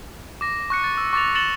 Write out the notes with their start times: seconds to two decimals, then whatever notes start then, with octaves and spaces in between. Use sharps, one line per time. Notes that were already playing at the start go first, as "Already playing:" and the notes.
0.41 D6 A#6
0.70 C#6 F#6 C#7
0.84 A6
0.97 E6
1.13 C#6 D6 A6 A#6 F7
1.35 A6 C#7 E7 F#7 G7